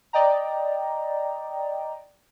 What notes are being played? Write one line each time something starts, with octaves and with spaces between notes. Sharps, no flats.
D5 D#5 G5 A#5